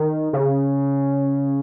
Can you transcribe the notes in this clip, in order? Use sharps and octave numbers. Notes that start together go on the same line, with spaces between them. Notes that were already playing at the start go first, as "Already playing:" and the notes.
Already playing: D#3
C#3